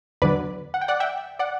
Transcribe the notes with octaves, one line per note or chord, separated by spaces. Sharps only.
E2 D3 F#3 B4 D5
F#5
G5
D5 F#5
E5 G5
D5 F#5